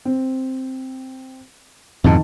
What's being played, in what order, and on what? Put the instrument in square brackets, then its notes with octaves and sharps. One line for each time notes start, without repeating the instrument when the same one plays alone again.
[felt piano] C4
[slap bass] F2 G#2 B2 [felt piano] D#3 A5